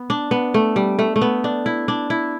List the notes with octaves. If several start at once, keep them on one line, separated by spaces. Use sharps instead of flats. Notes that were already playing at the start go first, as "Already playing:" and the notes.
Already playing: B3
D4
B3
A3
G3
A3
A3
B3
D4
E4
D4
E4